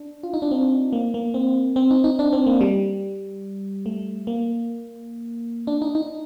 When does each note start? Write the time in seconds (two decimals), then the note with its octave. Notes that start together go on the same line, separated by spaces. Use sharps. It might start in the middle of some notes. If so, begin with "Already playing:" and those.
Already playing: D4
0.23 F4
0.34 D#4
0.42 D4
0.51 C4
0.93 A#3
1.14 A#3
1.34 C4
1.76 C4
1.91 D#4
2.04 D#4
2.19 D4
2.33 C4
2.46 A#3
2.61 G3
3.86 A3
4.27 A#3
5.67 D4
5.82 D#4
5.95 D#4